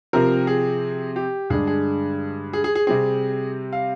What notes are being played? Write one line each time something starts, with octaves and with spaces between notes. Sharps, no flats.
C3 F3 C4 A#4
G#4
G4
G2 D3 G#3 D4 G#4
G#4
G#4
G#4
G#4
C3 G3 C4 G#4
F5